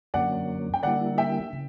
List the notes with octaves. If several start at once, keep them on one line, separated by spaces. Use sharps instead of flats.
F#2 D3 F#3 A#3 C#4 D5 F#5
G5
D3 G3 A#3 E4 D5 F#5
E5 G5
C#3